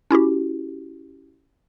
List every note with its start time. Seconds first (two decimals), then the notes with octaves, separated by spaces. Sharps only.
0.11 C#4 E4 F#4 G4